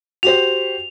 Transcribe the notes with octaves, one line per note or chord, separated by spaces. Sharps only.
F#4 G4 C5 F7